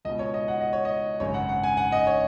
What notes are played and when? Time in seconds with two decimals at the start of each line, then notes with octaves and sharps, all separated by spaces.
0.05 C#2 D#5
0.09 B2
0.19 C#5
0.34 D#5
0.48 F#5
0.61 D#5
0.73 C#5
0.85 D#5
1.20 G#1 F#2 C#3 C#5
1.34 F#5
1.49 F#5
1.64 G#5
1.77 F#5
1.92 D#5
2.07 C#5